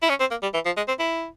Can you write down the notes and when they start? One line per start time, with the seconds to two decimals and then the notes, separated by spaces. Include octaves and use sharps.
0.02 E4
0.09 C#4
0.20 C4
0.31 A#3
0.42 G3
0.54 E3
0.65 F3
0.77 G#3
0.88 C4
0.99 E4